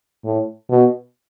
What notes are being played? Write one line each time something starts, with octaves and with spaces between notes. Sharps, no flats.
A2
B2